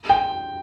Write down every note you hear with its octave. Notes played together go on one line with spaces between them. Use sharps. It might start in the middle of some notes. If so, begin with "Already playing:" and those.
G5